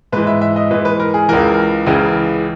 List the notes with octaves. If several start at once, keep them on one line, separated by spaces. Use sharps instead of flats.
G#2 E3 B4
E5
E5
D#5
G#2 E3 B4
B4
A#4
G#4
C#2 C#3 E3 A#4
C#2 C#3 E3